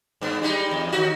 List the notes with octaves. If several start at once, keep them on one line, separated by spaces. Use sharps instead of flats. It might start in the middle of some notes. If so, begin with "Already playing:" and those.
G2 B3
G3 G#3 D#4
E2
D#2 D#4 F#4